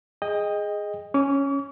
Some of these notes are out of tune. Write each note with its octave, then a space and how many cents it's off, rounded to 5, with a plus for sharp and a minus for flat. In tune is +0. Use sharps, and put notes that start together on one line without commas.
G#4 +0 D#5 +0 G5 +30
C#4 +0 C#6 +45